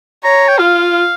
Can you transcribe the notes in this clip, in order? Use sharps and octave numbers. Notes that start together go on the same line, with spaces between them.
C#5 A#5
G5
F4 F5